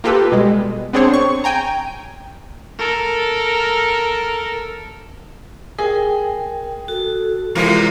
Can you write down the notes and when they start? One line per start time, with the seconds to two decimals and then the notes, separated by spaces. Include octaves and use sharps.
0.04 A#3 F4 G4 A4 B4
0.32 B2 G3 G#3
0.93 B3 C4 D4 G#4 C5 C#5
1.13 C#6
1.44 G5 G#5 A#5
2.79 A4 A#4
5.79 G#4 A#4 G5
6.88 F#4 A4
7.55 E2 C3 G#3 A#3 F4 A#4